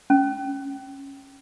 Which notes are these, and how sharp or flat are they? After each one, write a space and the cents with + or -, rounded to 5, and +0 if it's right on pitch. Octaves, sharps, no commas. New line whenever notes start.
C#4 -15